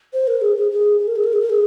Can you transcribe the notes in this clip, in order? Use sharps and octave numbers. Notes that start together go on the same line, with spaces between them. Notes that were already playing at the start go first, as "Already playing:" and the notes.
C5
A#4
G#4
G#4
G#4
G#4
A#4
G#4
A#4
G#4
A#4
G#4